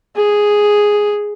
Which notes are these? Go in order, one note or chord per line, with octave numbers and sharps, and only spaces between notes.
G#4